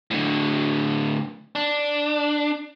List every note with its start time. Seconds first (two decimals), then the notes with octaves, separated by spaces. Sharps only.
0.11 A2 D3
1.55 D4